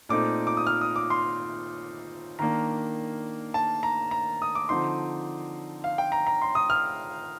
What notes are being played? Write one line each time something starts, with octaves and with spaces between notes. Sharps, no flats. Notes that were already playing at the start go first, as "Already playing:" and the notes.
A#2 A3 C4 D#4 D6
D6
D#6
F6
D#6
D6
C6
D#3 A#3 D4 A#5
A5
A#5
A#5
D#6
D6
D3 F3 C4 D#4 C6
F5
G5
A#5
A#5
C6
D#6
F6